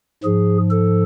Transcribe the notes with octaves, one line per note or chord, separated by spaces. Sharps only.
G#2 F3 G#4
A4